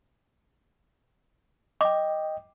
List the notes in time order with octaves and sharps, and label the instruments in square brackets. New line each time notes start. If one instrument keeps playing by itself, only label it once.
[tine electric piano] D#5 G5 [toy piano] D6